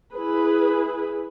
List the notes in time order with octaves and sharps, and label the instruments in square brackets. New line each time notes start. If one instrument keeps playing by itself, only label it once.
[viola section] E4 G#4 B4